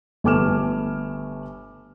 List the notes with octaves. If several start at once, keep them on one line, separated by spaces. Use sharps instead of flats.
G1 A3 G#5 D6 F6 E7